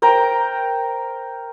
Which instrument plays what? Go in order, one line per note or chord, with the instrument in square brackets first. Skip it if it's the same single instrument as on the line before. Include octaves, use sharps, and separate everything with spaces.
[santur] A#4 C5 G5 A#5